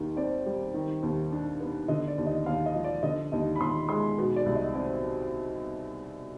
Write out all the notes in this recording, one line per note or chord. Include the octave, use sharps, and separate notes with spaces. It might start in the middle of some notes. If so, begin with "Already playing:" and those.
Already playing: D#2 D#3
C4 D5
G3
D#3
D#2
D4
B3
D3 D#5
D5
D#2
D#5
D#2 F5
D#5
F3
D5
D3 D#5
D#2 D#5
B5
D#2 C6
G#3 C6
B2
D5
C2
D#5
C4 D5